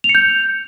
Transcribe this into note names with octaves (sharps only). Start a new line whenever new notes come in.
F7
C#7
G6